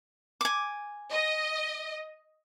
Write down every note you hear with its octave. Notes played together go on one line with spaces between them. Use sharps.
G#5 D6
D#5